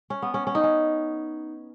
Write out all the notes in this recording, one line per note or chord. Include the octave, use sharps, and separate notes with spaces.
C#4
B3
C#4
C#4
D#4
C#4